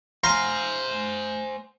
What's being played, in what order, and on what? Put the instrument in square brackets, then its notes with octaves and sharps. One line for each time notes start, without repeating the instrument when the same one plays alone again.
[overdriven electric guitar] C5 G#5 [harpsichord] F5 A#5 C6